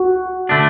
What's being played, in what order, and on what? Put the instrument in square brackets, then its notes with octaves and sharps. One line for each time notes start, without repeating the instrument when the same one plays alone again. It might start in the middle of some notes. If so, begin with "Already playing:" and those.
Already playing: [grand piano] F#4
[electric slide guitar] D3 A3 D4